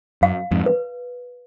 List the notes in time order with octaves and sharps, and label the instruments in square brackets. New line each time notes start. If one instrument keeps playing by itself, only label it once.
[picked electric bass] F#2 [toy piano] F5
[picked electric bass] F2 G#2
[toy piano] B4